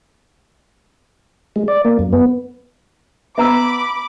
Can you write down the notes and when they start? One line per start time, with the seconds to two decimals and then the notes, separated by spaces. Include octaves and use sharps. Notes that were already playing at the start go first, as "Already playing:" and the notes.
1.56 G#3
1.68 D5
1.85 A#3
1.99 F#2
2.13 B3
3.38 B3 E5 A#5 B5 D6 E6